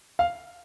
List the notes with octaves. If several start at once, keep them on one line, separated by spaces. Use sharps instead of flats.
F5